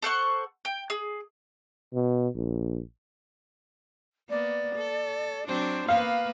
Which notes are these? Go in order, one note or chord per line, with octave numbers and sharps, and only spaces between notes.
A4 C5 F#5 C#6
G5
G#4
B2
A#1
A#3 B3 D5
A4
F#3 C4 D4 C5
A#3 B3 B4 F5